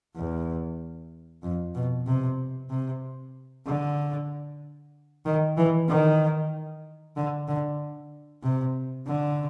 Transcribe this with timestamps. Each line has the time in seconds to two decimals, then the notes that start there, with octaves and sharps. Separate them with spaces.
0.16 E2
1.43 F2
1.75 B2
2.07 C3
2.70 C3
3.66 D3
5.26 D#3
5.57 E3
5.89 D#3
7.16 D3
7.48 D3
8.44 C3
9.07 D3